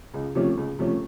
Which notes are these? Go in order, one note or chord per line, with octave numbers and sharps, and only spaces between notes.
C#2
C3 F3 A3 C#4
C#2
C3 F3 A3 C#4